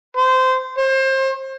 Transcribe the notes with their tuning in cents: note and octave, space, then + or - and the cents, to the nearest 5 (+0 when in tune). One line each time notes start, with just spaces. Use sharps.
C5 -20
C5 +30